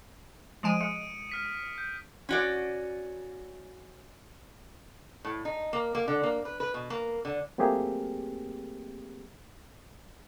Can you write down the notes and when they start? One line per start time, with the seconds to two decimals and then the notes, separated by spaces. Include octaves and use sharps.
0.63 F3 G#3 G#5 D#6 D7 D#7
0.81 G#3 C#7
1.29 F6 B6 D#7
1.78 G6
2.29 C#4 F#4 D5
5.25 A2
5.45 D#4
5.73 A#3
5.95 A#3
6.08 D3
6.23 A#3
6.45 B4
6.60 B4
6.74 B2
6.90 A#3
7.25 D3
7.58 F#3 A3 A#3 C4 G4 G#4